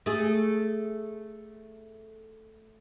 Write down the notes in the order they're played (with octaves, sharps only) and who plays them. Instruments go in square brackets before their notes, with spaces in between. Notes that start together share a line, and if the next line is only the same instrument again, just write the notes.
[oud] A3 G#4